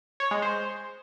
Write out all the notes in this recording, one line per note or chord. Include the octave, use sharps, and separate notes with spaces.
C#5
G#3
C5